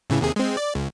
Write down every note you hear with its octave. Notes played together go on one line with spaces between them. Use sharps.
A2 C#3 E3
D#2 C3 G#4
G#3 C4
D5
C#2